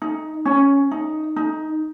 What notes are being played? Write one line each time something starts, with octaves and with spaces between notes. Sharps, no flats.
D#4
C#4
D#4
D#4